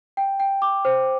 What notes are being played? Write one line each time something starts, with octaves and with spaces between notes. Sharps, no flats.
G5
G5
D6
C5